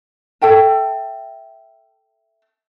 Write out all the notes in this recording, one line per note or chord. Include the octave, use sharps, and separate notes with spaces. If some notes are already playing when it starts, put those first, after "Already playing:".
A4 E5 G5 A5